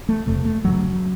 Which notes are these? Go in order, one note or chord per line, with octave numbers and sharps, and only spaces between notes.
A3
F1 F2 C3 A3
A3
F#1 F#2 C#3 F#3